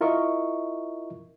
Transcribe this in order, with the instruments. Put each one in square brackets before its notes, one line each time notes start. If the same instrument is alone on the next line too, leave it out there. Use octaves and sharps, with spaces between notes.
[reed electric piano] E4 F4 A#4 D#5 E5 C#6